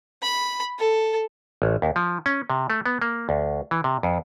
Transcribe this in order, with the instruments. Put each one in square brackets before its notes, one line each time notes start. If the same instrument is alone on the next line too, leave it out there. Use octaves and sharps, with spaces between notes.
[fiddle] B5
A4
[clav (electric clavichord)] A1
D#2
F3
C#4
C3
A3
B3
A#3
D2
E3
C3
F2